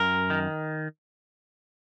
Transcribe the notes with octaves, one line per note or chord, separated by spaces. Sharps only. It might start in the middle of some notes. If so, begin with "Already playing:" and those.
Already playing: F#2 A#4
D#3